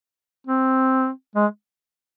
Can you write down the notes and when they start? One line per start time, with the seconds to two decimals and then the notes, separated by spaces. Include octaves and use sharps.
0.47 C4
1.36 G#3